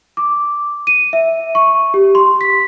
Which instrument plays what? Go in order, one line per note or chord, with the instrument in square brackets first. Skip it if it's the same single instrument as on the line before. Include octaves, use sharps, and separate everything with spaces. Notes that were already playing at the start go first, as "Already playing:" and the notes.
[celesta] D6
D#7
E5
C#6
G4
C6
B6